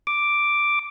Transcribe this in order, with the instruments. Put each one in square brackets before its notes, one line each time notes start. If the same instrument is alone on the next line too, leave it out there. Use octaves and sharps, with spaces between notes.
[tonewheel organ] D6